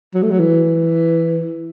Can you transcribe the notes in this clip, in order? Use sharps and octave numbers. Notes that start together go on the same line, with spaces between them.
F#3
A3
F#3
E3